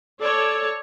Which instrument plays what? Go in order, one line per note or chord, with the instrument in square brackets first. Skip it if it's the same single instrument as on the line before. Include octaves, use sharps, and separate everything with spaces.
[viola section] A4 C#5 D5